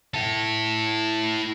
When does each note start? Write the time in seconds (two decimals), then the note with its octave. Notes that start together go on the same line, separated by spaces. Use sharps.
0.14 E4 A4